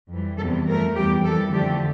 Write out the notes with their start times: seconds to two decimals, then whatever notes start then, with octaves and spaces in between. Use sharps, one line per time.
0.11 F2 E3 G3
0.39 E2 C3 E3 G3 A4
0.67 G2 F3 A3 A#4
0.96 E2 E3 G3 G4
1.24 F2 E3 G3 A4
1.52 F2 D3 F3 A3 G4